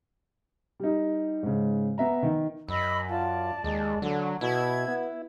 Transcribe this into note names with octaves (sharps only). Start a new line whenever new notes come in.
G3 D#4
G#2 C#3
B3 E5 A#5
D#3
F#2 D#5 B5 E6
F4 D5 A5
D#2 G#3
D3 F#3
B2 E4 G#6
B3